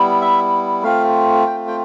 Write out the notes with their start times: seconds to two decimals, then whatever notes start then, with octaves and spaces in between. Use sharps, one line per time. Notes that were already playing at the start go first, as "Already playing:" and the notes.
Already playing: G3 B3 E4
0.21 E5
0.83 A3 C4 F4 F5
1.46 G5
1.67 G5